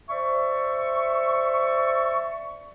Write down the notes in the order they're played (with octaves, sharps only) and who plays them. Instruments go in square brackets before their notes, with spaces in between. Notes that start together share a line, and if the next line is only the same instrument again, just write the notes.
[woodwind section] C5 D5 E5 C#6